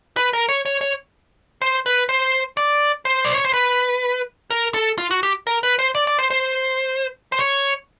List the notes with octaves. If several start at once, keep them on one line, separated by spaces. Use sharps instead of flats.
B4
A#4
C#5
C#5
C#5
C5
B4
C5
D5
C5
D5
C#5
C5
B4
A#4
A4
F4
F#4
G4
A#4
B4
C5
D5
D5
C5
C5
C5
C#5